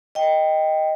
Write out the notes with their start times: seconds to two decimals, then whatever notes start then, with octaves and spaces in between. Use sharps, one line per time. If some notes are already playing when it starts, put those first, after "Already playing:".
0.15 D#5 G5